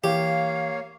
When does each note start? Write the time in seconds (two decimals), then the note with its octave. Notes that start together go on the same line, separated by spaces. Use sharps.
0.04 E3 A#3 G4 C#5 F5